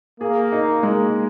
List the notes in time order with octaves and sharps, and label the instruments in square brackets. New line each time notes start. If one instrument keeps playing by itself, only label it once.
[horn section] A#3 [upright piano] G#4
[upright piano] D#4
G#3